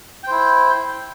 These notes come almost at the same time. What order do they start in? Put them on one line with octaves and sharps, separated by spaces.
G5 C5 E4